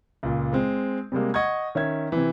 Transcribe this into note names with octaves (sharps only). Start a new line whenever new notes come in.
C#2 A#2
G#3 C4
C3 G3 G#3 A#3
D#5 F#5 C#6 G#6
D#3 C#4 E5 G#6
C3 E3